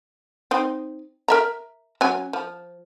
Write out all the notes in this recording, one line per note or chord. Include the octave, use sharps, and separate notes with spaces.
C4 D#4
A#4 E5 A#5
F#3 C#4 G#5
F3